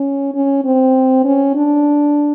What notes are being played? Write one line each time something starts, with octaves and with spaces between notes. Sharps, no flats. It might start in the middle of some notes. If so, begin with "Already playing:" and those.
Already playing: C#4
C#4
C4
C#4
D4